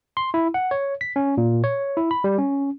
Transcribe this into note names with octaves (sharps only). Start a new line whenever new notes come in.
C6
E4
F#5
C#5
B6
C#4
A#2
C#5
E4
B5
G3
C#4